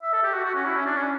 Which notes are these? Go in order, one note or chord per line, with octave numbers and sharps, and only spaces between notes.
E5
A4
G4
F#4
F#4
C#4
E4
C#4
D4
C#4